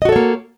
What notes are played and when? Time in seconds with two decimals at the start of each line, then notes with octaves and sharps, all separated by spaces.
0.02 D#5
0.05 F#4
0.09 A4
0.12 C#5
0.16 A#3